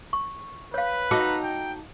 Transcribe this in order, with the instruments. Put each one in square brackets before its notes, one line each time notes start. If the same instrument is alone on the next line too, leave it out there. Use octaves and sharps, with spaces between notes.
[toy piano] C#6
[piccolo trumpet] B4 [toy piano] C#5 F5
[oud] D#4 F#4 A4 [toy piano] D6
[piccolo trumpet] G5